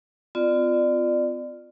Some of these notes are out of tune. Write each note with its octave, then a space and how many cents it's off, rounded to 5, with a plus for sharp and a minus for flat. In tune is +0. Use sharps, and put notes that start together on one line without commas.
C4 -40 F4 +0 D5 +25